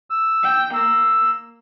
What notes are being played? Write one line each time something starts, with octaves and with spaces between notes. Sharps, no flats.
E6
G5
A#3 E6